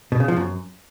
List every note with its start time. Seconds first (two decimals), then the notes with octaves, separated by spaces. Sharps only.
0.12 B2
0.20 C#3
0.28 F3
0.36 F#2